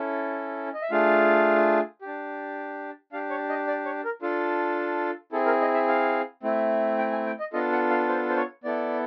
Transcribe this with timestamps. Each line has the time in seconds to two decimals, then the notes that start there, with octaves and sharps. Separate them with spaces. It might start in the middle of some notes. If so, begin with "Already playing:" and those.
Already playing: C#4 E4 A4
0.74 D#5
0.82 E5
0.91 A3 D4 F4 G#4 F5
2.02 D4 G4
3.13 D4 G4 F5
3.30 C#5
3.49 D#5
3.67 D5
3.85 C#5
4.05 A#4
4.22 D4 F4 A4
5.32 C4 E4 G#4 A4
5.46 A#4
5.61 D#5
5.74 E5
5.88 F5
6.43 A3 C4 E4
6.99 G5
7.12 G#5
7.26 G5
7.40 D#5
7.53 B3 D4 F4 A4 D#5
7.72 F#5
7.90 F5
8.09 C5
8.29 C5
8.36 C#5
8.64 B3 E4 A4 D5